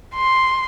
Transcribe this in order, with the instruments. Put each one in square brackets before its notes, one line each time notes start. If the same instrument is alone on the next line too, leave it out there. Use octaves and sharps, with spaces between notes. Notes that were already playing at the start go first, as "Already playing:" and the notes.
[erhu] C6